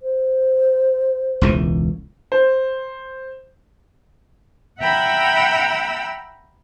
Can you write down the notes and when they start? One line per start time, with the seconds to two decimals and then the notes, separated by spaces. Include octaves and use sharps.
0.02 C5
1.41 E1 C#2 E3
2.32 C5
4.80 E5 F#5 G5 A#5 B5 E6